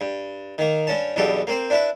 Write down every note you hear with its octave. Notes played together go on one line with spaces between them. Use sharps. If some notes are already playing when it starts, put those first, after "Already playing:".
G2
D#3 A#3
G2 C#4 A5
B1 E2 G2 B2 G4 A4
A#3 C4 C5
D4 E4 B4